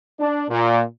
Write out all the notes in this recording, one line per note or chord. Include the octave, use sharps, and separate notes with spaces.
D4
A#2